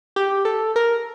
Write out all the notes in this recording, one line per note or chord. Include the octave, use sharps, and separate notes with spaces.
G4
A4
A#4